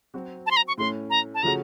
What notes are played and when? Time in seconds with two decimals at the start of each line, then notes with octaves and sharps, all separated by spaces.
0.14 F#3 C4 F#4
0.46 A5
0.51 C6
0.57 A#5
0.68 C#6
0.78 A2 A3 C#4 C6
1.10 A#5
1.34 A5
1.43 C#3 F3 A3 C#4 F#4 A#5